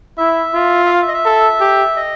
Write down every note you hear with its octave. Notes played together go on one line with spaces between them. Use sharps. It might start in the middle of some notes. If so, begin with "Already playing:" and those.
E4 E5
F4
E5
F5
E5
D#5
E5
A4
G4
D#5